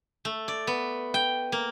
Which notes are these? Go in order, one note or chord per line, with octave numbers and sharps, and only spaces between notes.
A3
D5
B3
G5
A#3